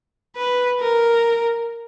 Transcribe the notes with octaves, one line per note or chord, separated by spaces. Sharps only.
B4
A#4